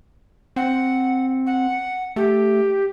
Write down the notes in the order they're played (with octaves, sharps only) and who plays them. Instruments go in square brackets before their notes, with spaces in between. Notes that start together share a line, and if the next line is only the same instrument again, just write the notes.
[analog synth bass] C4 [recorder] F#5
[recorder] F#5
[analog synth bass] A3 [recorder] G4